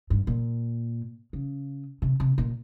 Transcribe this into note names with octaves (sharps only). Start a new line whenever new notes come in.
G2
A#2
C#3
C3
C3
A#2